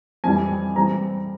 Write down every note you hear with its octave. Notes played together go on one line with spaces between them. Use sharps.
F2 E3 G3 G#5
E3 G3 C4 A#5